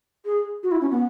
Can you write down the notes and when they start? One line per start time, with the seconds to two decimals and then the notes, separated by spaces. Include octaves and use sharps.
0.25 G#4
0.63 F#4
0.71 E4
0.81 C#4
0.91 B3